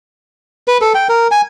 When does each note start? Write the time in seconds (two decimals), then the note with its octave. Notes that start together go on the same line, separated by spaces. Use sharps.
0.68 B4
0.81 A4
0.95 G5
1.09 A#4
1.31 G#5